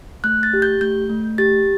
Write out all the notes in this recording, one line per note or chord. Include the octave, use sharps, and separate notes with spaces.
A3 F#6
A6
G4
G6
A3 G6
A3
G4 A6